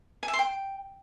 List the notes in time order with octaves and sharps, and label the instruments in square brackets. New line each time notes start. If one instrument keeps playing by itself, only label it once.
[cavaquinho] G#5
E5
C6
G5